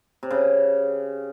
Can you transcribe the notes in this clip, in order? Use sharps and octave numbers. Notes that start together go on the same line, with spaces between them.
C3
C#3